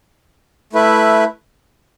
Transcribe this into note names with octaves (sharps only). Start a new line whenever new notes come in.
A3 E4 B4 E5